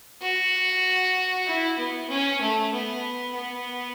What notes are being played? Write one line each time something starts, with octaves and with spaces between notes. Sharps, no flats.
F#4
E4
B3
C#4
A3
B3
B3